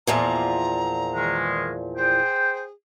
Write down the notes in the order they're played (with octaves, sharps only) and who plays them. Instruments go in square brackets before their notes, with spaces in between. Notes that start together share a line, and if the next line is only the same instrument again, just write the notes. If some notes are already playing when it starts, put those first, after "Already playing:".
[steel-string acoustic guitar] E2 A#2 F3 [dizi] A#5
[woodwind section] D#3 E3 G#3
[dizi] G#4 [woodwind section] C5 G5